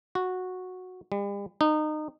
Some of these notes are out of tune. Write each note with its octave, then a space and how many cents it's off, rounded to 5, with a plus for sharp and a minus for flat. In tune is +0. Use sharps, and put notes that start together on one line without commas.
F#4 -10
G3 +45
D#4 -25